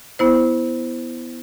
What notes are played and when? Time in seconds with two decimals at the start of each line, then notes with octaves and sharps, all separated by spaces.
0.19 B3 E4 C5